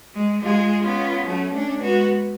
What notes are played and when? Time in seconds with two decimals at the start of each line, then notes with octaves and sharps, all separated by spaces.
0.14 G#3
0.42 G#3 F4 G#4
0.84 B3 C#4 F4
1.26 F#3 A3 C#4
1.54 A3 C#4 D4
1.82 G#3 B3 F#4